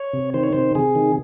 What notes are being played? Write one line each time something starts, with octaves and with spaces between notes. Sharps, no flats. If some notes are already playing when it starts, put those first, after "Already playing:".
Already playing: C#5
C3
D#3 C5
C#5
C3 C5
C3 G#4
D#3